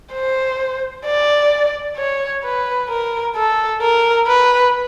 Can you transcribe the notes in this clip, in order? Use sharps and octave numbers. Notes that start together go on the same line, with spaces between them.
C5
D5
C#5
B4
A#4
A4
A#4
B4